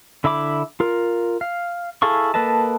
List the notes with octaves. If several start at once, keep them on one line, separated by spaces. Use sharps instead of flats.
D3 E4 E5 B5 D6
F4 A#4
F5
E4 G#4 A4 F5 C#6
A#3 A4 B4 D#5 A5